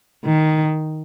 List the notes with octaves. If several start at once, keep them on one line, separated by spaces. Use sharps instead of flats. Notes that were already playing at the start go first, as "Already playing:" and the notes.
D#3